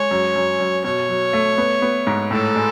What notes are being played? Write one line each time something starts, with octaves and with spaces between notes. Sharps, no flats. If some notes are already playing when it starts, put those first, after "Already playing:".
Already playing: G#3 C#5
F#2
F#2
F#2
B2 C#5
F#3
A3
B3
B3
G#2
A2 A4
G#3